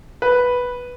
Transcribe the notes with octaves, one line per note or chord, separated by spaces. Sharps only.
B4